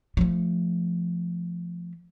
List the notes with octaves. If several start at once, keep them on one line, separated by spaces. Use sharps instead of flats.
F3 A3